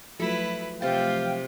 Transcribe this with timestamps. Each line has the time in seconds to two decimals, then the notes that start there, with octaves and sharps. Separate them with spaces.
0.20 F3 F#3 A3 E4 A4 B4
0.82 C3 F4 G4 F5 G5 A5